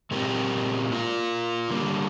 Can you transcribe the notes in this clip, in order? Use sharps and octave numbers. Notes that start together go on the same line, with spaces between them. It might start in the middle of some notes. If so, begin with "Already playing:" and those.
A#2 G#3 C4 G4 A#4
A#3 F4 A#4
D3 G3 A#3